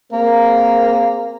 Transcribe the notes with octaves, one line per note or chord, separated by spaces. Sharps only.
A#3 C4 G#4 A#4